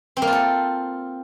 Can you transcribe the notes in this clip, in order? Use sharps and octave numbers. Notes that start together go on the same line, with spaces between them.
C4
A#3
F4
A4